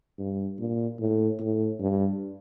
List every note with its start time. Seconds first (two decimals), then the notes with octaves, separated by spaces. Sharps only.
0.19 G2
0.59 A#2
1.00 A2
1.40 A2
1.80 G2